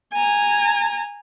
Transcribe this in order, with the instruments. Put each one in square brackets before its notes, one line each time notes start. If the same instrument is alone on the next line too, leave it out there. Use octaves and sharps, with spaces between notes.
[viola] G#5 A#5